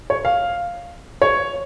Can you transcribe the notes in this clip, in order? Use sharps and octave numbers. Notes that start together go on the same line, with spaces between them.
C#5
F5
C#5